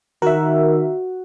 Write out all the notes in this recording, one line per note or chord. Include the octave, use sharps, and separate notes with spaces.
D#3 F#4 A#4 E5